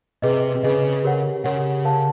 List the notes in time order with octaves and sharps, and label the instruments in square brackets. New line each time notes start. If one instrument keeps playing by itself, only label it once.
[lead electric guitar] C3 [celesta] G#4 B4 D#5
[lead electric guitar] C#3 [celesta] G#4 B4 D#5
[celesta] G4 A#4 C#5 F#5
[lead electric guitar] C#3 [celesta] G4 A#4 C#5 F#5
[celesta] A#4 C#5 F5 A5